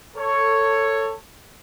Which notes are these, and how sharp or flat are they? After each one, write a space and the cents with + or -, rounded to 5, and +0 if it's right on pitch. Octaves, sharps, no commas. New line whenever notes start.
A4 +20 C#5 +0